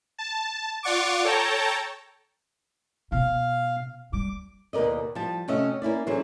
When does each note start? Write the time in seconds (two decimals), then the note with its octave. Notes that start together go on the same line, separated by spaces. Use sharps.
0.18 A5
0.83 F4 D5 F#5 C#6 D6
1.25 A4 C#5 G5 A5 A#5
3.12 B2 F5
4.13 G3 D6
4.73 D#2 B2 A#4 D5 D#5
5.15 F3 G3 A5
5.48 C3 A3 C#4 F#4 D#5 E5
5.82 A#3 C#4 E4 D5
6.07 D3 E3 F#3 C#4 G#4 C5